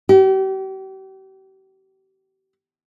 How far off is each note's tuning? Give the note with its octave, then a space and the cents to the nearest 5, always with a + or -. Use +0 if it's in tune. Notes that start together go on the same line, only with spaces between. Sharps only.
G4 -40